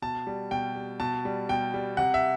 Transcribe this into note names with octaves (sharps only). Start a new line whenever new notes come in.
B2 A5
G3
B2 G5
G3
B2 A5
G3
B2 G5
G3
C3 F#5
E5